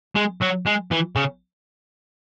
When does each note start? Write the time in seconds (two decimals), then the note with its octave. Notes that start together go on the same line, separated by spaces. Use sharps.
0.15 G#3
0.41 F#3
0.66 G#3
0.91 E3
1.16 C#3